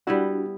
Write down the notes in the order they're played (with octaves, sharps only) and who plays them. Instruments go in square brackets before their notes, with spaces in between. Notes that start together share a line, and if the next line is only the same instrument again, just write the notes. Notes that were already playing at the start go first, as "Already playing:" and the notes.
[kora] G3 B3 E4 [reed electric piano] D4 F#4